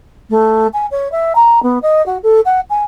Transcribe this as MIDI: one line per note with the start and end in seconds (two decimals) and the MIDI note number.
0.30 0.67 57
0.73 0.86 80
0.91 1.10 73
1.12 1.33 76
1.35 1.62 82
1.63 1.78 59
1.82 2.04 75
2.06 2.18 66
2.23 2.40 69
2.45 2.60 78
2.70 2.83 80